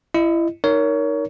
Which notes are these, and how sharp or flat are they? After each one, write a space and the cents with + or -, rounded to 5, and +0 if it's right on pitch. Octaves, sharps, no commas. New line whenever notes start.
E4 +25 D#5 -15
D#4 +0 A#4 +0 C#5 +25